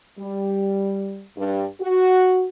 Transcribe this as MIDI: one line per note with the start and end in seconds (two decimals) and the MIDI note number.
0.18 1.23 55
1.36 1.65 43
1.80 2.47 66